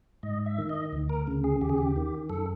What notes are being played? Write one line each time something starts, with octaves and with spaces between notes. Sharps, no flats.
G#2 D#5
E5
D#3
D#5
D2
A#4
C#3
G#4
D#2 G4
G#4
G4
D#3
F#2 A4